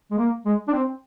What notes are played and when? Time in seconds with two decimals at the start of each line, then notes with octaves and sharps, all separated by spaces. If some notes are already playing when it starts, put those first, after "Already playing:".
0.11 G#3
0.18 A#3
0.46 G#3
0.68 D4
0.73 C4